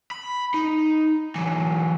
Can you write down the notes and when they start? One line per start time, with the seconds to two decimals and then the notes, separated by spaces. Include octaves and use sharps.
0.11 B5
0.54 D#4
1.35 E3 F#3